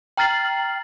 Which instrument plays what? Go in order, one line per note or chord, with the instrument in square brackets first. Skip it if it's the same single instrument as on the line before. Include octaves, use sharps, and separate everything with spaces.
[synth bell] G5 A#5 F6 A6 C7 F#7